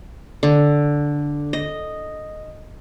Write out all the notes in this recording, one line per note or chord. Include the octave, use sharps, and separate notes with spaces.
D3
D#5